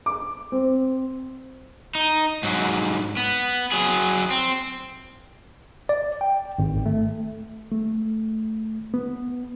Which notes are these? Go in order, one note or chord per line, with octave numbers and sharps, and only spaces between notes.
D6
C4
D#4
G#2 F#3
B3
F#3 G#4
C4
D5
G5
G#1
A3
A3
B3